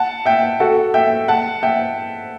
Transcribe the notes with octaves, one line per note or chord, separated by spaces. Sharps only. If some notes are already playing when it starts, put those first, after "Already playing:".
Already playing: F#5 A5
E5 G5
F#4 A4
E5 G5
F#5 A5
E5 G5